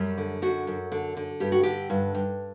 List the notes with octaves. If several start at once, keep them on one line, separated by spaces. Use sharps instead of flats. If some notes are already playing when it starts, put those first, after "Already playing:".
Already playing: F#2 G3
D3
F#2 F#4
F#2
D3
D3
G2 G4
F#4
D3 G4
G2
G2